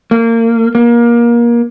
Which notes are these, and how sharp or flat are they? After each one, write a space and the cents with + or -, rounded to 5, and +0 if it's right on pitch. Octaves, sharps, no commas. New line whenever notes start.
A#3 -25
A#3 +25